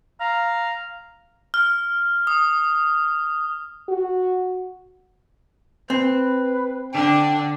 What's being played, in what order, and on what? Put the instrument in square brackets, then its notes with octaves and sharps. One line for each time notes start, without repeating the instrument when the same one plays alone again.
[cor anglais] F5 [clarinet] A#5
[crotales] F6
D#6
[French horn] F#4
[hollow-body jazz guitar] C4 [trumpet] B4
[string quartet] D3 D4 [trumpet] G5